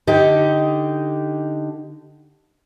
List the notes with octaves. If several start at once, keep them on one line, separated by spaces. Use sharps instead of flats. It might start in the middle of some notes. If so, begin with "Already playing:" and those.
D3 D#4 G4